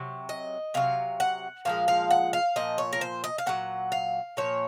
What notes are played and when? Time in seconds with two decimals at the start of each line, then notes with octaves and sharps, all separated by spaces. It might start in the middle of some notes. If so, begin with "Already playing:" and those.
Already playing: C3 F#3
0.29 D#5
0.74 C3 F#3 F5
1.20 F#5
1.65 A#2 F3 G#3 F5
1.88 F5
2.11 F#5
2.33 F5
2.56 A#2 F3 D#5
2.78 C#5
2.93 A#4
3.01 C5
3.24 D#5
3.38 F5
3.46 A#2 F#3 F#5
3.92 F5
4.37 A#2 F3 C#5